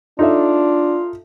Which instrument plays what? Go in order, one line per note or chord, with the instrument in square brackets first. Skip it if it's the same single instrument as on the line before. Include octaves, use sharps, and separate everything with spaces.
[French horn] D4 [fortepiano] D#4 A4 E5 [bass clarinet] F4